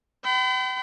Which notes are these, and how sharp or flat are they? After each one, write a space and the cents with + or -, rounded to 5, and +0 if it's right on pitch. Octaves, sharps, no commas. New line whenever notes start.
G5 -40 B5 +40